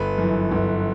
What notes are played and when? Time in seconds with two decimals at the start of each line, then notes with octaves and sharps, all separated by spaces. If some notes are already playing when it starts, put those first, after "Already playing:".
Already playing: G1 B4
0.18 F#2 E3
0.52 G1